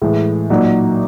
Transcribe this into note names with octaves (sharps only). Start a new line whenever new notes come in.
A2 E3 G#3
A#2 F#3 A#3 D#4 F#4